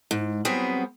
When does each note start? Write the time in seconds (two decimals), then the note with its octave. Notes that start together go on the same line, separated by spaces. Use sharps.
0.11 G#2
0.45 F#3 G3 B3 C4 G#4